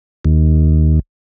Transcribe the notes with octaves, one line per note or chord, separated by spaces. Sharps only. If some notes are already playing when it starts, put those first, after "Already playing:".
D#2